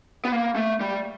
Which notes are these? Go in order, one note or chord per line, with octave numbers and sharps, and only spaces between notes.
B3
A#3
A3
G3